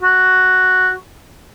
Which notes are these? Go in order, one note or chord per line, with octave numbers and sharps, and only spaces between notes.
F#4